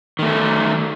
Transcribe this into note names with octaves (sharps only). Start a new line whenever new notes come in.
D#3 A3